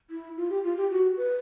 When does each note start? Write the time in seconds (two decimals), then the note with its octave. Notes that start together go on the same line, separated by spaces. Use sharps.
0.10 E4
0.37 F4
0.50 G4
0.64 F4
0.77 G4
0.90 F#4
1.17 B4